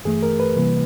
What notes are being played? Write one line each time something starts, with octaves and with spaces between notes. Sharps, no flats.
G2 E3 A3 G#4
A#4
B4
C3 E3 G3 A#3